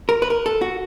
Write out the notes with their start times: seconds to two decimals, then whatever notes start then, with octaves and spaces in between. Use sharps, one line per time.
0.09 A#4
0.22 B4
0.30 A#4
0.46 A4
0.62 F#4